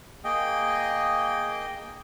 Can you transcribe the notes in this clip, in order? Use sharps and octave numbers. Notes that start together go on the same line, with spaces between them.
A#3 G#4 D#5 G5